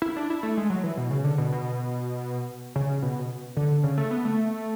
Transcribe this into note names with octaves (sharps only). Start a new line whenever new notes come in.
E4
D4
E4
A3
G#3
F#3
E3
B2
C#3
D3
B2
B2
C#3
B2
D3
C#3
A3
B3
A3